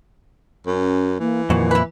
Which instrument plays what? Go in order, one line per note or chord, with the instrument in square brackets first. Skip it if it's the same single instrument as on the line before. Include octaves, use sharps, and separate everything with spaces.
[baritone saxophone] F#2 [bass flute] C#4
[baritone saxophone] E3 [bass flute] A#3
[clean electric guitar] F2 A#2 [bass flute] D#3 [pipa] F#4
[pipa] E4 B4